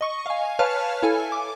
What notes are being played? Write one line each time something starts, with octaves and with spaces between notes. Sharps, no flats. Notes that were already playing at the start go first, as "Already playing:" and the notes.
D#5 C#6
F5 G#5
B4 C#5 F5 A5 F6
E4 A4 G#5
D6